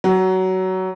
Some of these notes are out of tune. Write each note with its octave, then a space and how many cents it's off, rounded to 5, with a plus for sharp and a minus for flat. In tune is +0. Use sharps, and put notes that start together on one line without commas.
F#3 +20